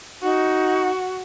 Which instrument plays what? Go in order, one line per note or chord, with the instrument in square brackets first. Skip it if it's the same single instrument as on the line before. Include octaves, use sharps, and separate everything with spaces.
[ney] D#4 [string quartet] F#4